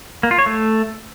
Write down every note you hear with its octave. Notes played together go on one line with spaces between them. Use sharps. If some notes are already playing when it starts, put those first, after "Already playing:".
A#3
F4
C#5
A3